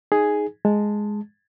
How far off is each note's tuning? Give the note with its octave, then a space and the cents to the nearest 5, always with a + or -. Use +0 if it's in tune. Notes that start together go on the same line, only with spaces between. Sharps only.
D#4 +0 G#4 +5 G#5 +0
G#3 +0 A5 +0